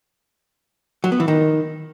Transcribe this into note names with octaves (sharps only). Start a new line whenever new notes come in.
F#3
B3
E3
D#3